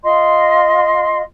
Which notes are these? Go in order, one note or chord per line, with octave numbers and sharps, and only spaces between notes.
F4 D#5 C6